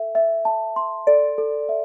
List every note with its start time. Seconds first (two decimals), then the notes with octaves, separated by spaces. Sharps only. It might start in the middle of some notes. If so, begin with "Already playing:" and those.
Already playing: A4 E5
0.15 E5
0.45 A5
0.76 C6
1.07 A4 D5
1.38 A4
1.69 E5